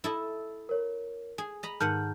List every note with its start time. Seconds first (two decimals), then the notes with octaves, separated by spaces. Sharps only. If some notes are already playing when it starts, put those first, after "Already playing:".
0.04 E4 A4 D#5
0.69 A#4 C#5
1.38 G#4 G#5
1.63 D#5 A#5 B5
1.80 G#2 D#3 F#5 A5 F6 G6